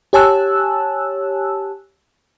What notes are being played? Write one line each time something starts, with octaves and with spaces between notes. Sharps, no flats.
G4 C#5 G#5 A5 E6 F#6